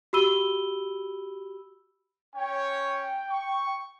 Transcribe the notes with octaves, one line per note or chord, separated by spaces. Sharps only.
F#4 G4 B5 E6 D#7 G7
C#4 C#5 G5
C#6